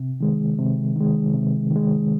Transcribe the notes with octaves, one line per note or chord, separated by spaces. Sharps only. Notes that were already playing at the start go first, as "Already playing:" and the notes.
Already playing: C3
D#3 G#3
C3
D#3 G#3
C3
D#3
G#3